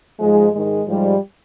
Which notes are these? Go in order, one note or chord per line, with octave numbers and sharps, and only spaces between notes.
G#2 F3 G#3
G#2 D#3 G#3
G#2 F3 G3